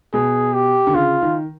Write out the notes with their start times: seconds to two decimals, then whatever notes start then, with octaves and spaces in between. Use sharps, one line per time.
0.13 B2 G#4
0.53 G4
0.87 D3
0.95 C#3 F4
1.22 D#3